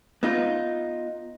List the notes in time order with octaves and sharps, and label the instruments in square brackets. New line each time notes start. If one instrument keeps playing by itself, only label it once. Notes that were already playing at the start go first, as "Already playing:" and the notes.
[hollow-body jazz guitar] B3 D#4 F4